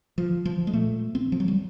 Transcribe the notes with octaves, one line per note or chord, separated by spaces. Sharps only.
F3
F3
G#3
A#2 A3
C4
F3
F#3
G3